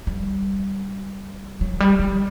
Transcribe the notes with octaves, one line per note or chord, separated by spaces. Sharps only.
G3
F#3
G3
G3